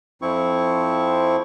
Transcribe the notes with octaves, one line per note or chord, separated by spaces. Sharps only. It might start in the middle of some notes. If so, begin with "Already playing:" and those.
F2 F3 C4 E4 C#6